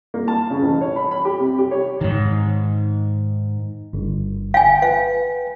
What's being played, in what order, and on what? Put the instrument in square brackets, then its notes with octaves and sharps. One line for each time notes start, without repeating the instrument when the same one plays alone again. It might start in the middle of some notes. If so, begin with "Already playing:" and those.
[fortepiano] A#3
A5
C#3
A1
C#5
B5
B5
G4
C3
G4
C#5
[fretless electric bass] G#2 D#3
[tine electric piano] G1
[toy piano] F5 G#5 [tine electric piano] G5
[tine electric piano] B4 [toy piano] F5